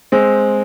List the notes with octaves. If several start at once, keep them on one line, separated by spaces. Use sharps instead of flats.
G#3 C4